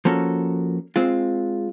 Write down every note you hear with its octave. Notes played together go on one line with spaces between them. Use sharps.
F3 A#3 C#4 F#4 A4
G#3 C4 F4